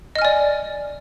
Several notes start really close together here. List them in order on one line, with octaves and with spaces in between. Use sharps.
D#5 F6 G#5 D5